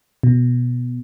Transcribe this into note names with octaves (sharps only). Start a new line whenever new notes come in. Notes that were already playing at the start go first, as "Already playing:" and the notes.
B2